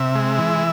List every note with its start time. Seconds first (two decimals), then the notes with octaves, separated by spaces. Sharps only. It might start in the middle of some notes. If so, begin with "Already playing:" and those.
Already playing: C3 E5
0.15 G#3
0.38 E3